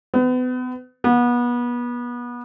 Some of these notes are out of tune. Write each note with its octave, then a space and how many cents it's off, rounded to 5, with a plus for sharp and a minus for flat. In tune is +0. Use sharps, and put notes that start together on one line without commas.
B3 +35
B3 -30